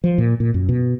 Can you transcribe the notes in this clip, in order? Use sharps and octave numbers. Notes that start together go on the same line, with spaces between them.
F3
A#2
A#2
F#2
B2